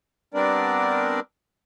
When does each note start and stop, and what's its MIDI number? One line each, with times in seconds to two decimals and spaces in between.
0.34 1.20 55
0.34 1.20 59
0.34 1.20 60
0.34 1.20 62
0.34 1.20 70
0.34 1.20 74